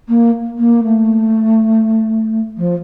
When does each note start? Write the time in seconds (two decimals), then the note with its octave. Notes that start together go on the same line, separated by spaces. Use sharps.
0.08 A#3
0.58 A#3
0.83 A3
2.57 F3